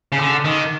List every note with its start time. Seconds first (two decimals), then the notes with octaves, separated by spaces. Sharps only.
0.12 C#3
0.18 D3
0.45 D#3